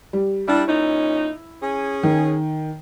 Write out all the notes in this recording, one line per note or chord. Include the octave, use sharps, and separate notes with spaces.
G3
G3 D4 E4
A#2 C#4 D#4
C#4 G#4
D#3